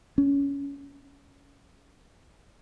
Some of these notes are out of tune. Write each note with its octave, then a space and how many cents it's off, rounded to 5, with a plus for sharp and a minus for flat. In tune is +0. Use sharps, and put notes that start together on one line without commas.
C#4 +20